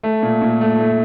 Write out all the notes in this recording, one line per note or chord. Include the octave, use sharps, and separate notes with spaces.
A3
A#2
A#2
A3
A3